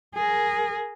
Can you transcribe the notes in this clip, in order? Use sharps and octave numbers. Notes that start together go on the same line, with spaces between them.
G#4 A#4